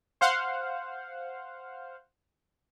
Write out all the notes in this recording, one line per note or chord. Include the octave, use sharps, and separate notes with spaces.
C5 F5 F#5